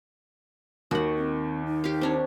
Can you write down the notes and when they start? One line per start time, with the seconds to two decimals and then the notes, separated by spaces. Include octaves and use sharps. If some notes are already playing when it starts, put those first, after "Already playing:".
0.91 D#2 D#3 F#4 F#5
1.17 C4
1.66 D#4
1.84 G4 F5
2.01 C4 D4 C#5